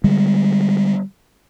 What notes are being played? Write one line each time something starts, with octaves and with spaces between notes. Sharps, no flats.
D3 G3 G#3